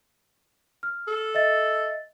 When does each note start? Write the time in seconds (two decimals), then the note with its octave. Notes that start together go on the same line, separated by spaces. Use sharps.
0.83 F6
1.08 A4
1.35 D#5 E5 A6